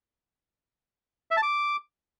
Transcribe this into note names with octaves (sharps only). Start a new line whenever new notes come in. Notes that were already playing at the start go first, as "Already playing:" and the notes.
E5
A5
D6